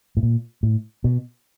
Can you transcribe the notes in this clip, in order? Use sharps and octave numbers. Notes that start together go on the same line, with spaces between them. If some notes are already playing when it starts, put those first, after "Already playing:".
A2
A#2
A2
B2